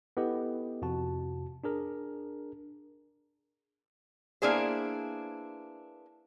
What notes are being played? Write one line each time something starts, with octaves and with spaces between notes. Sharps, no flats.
B3 E4 G4 A4 B4 D#5
F2 C3 F#4 A5
D4 G#4 A#4
A#3 B3 D4 E4 G#4 C5